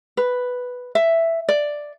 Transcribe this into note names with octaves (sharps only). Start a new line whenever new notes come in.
B4
E5
D5